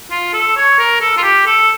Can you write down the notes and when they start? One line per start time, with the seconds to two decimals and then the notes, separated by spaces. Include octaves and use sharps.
0.10 F4
0.34 A4
0.57 C#5
0.79 A#4
1.01 A4
1.17 F4
1.24 G4
1.47 A4